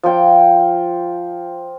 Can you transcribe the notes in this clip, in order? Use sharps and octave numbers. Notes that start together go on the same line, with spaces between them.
F3 G5